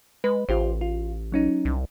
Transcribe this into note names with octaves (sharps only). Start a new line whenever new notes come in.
G#3 B4
A1 F4 G4 C5
F4
F#3 C#4 D#4
C2